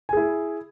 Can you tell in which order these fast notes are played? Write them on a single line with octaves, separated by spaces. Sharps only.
G#5 G#4 E4